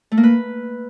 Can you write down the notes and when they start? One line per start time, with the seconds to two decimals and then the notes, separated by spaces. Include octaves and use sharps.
0.12 A3
0.17 A#3
0.23 B4